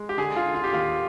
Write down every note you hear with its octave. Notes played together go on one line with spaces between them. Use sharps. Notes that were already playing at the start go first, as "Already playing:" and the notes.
Already playing: G#3
G4
D3 G#4
F4
D3
F4
G4
D#2 F4